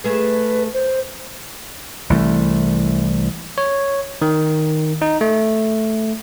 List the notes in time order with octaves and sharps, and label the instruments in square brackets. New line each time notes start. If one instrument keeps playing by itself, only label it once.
[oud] A3 G#4 [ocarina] B4
[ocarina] C5
[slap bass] C2 E3 A3
[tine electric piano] C#5
D#3
D#4
A3